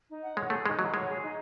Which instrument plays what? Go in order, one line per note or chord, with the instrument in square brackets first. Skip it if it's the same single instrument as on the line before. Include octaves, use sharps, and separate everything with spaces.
[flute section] D#4
F#5
[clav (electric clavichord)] G#3 [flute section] C#5
[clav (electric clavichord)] A3 [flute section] G#4
[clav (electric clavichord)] G#3 [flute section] D#4
[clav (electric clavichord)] F#3 [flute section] F#5
[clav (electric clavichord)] G#3 [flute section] C#5
[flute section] G#4
D#4